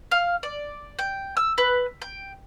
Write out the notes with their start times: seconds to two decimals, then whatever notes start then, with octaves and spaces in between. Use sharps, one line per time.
0.11 F5
0.43 D5
0.99 G5
1.37 E6
1.58 B4
2.02 G5